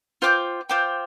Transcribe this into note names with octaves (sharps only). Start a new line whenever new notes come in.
F4 C5 G5 D6
F4 C5 G5 D6